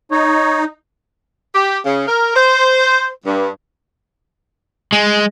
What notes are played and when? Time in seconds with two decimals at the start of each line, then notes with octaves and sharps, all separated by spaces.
0.11 D#4 C#5
1.55 G4
1.85 C#3
2.07 A#4
2.35 C5
3.26 G2
4.93 G#3